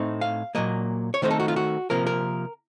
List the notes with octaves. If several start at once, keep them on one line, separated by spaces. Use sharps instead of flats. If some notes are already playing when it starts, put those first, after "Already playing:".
Already playing: A2 A3 C4 D#4
F5
A#2 F#3 A#3 D#5
C#5
D#3 A3 C4 D#4 C5
A4
F#4
F4
F#4
C3 F3 A#3 A#4
A#4